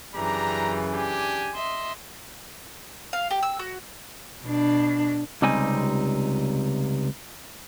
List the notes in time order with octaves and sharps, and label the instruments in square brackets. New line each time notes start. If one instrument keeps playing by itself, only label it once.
[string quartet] F#2 C#3 E3 [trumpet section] D4 G4 A#5
[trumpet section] D4 G4 G#5
[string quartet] D#5 E5 C6
[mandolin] F5
G4
E6
F#4
[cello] B2 D4
[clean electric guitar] C#2 C3 G3 C4 D#4 G#5